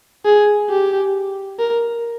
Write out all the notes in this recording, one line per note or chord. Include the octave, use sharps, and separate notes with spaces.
G#4
G4
A#4